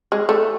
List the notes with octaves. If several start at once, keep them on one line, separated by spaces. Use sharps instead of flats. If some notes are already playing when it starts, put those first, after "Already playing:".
G#3
A3